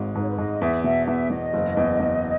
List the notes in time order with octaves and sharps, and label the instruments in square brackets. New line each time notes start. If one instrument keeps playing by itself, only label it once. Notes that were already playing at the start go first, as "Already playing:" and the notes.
Already playing: [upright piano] G#1 G#2
[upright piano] G#2 [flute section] B4
[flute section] C#5
B4
[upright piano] G#2 [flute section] D#5
[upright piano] E2 [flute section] E5
[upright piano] B2 [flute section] E5
[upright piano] E2 [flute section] E5
[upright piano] E2 [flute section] D#5
[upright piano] F#1
E2
E2